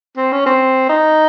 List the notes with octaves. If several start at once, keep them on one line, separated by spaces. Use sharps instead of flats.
C4
C#4
C4
D#4